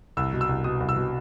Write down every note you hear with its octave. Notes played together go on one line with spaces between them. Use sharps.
C2 E6
B2
E6
C2
B2 D#6
C2
E6
B2